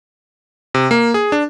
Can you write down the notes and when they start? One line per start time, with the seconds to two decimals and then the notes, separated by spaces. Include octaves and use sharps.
0.74 C3
0.91 A#3
1.14 G#4
1.32 D4